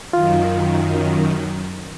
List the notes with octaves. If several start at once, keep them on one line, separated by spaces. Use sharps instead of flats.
F#2 D#3 F4